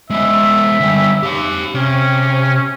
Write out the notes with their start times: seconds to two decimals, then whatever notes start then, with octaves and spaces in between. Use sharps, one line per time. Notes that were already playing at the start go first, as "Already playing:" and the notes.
0.10 G#3 B3 E5
0.80 D3 G3
1.23 G4 F5
1.75 C3 C#4